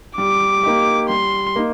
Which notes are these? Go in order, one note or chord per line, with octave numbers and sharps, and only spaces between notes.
G3 D6
A#3 D#4 G4
G3 C6
A#3 D#4